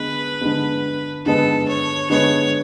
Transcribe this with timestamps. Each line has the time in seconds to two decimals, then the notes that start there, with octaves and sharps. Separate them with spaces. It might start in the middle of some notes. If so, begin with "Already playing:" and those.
Already playing: D3 G#3 B3 B4
0.41 D3 G#3 B3
1.25 D3 G#3 B3 A4
1.68 C#5
2.10 D3 G#3 B3 C#5